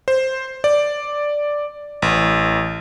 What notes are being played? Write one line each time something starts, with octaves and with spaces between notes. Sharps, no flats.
C5
D5
A1